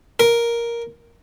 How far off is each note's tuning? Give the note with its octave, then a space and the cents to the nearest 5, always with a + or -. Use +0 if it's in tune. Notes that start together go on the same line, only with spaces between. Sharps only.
A#4 +5